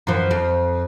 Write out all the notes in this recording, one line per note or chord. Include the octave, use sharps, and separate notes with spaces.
F#2 E3 F3
F2